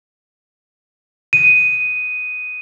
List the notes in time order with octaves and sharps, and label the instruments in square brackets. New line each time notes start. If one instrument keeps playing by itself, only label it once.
[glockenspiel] D#7